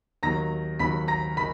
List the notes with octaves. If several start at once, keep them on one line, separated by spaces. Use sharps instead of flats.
D#2 D#3 F#3 A#5 A#6
D#2 D#3 F#3 B5 B6
A#5 A#6
D#3 B5 B6